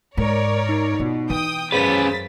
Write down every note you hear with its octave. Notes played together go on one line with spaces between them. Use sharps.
G#2 A#4 C#5 D5
D#4
B2 F4
E3 G5 D#6
F#2 C#4 G#4 B4 C5 F5 A6 B6